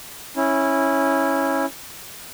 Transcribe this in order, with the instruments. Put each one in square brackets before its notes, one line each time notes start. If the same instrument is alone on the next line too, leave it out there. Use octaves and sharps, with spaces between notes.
[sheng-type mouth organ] C#4 E4